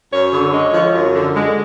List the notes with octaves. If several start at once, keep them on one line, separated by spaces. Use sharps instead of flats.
F#2 C#5
D3
G#3
F3
F#2
D3
G#3